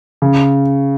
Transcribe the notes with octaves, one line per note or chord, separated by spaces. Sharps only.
C#3